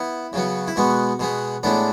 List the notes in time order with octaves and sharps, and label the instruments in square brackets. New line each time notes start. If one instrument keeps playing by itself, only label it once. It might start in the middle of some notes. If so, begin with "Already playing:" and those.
Already playing: [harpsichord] B3 E4
C#3 F#3 B3
E4
B2 G#3 B3 F#4
B2 G#3 B3
A2 G#3 B3 D4